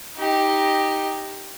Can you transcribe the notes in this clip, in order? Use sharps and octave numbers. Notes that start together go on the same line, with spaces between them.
D#4 G4